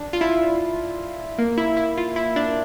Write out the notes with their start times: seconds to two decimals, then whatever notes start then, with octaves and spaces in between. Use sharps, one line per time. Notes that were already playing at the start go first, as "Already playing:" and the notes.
Already playing: D4
0.13 F4
0.21 E4
1.38 A#3
1.58 E4
1.77 E4
1.98 F4
2.16 E4
2.36 D4